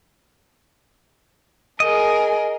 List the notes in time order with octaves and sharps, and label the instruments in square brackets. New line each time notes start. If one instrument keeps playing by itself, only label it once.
[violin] G#4 A#4 [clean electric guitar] D#5